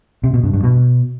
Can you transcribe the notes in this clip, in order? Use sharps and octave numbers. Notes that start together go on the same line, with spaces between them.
C3
B2
G2
G2
B2